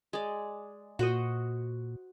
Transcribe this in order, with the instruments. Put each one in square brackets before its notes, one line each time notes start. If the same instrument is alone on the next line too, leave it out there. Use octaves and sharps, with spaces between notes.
[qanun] G#3 D5
[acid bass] A#2 [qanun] F#4 C5 D#5